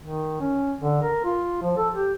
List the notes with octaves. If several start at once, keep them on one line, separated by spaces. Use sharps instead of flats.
D#3
C#4
D3
A#4
F4
F3
A4
G4